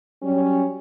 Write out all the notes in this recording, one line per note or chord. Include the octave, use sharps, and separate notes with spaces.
F#3 G3 C#4